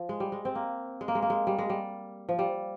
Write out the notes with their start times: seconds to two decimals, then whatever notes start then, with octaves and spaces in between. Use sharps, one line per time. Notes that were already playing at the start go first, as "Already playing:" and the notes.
Already playing: F3
0.09 G#3
0.20 G3
0.32 G#3
0.45 C4
0.55 A#3
1.01 G#3
1.08 A#3
1.15 G#3
1.22 A#3
1.30 G#3
1.47 G3
1.59 G#3
1.70 G3
2.29 F3
2.39 G3